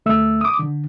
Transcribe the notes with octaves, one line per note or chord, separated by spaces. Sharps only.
D2 A3 E5 E6
D6 D#6
D3